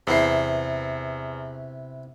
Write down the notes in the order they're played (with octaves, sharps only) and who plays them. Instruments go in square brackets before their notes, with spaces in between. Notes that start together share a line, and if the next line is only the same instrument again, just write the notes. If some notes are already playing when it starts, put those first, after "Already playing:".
[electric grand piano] E2 C7 [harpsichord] C3 B3 E4